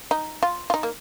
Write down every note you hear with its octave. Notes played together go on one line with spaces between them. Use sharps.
D#4
F4
F4
D#4
A#3